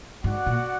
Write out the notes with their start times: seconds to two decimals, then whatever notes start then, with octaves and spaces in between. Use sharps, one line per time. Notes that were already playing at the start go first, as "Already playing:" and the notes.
0.23 G#2 F#4 D5 F#5
0.46 A#2